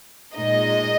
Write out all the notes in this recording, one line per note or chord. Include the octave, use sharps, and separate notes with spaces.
A#2 G#3 D#4 D#5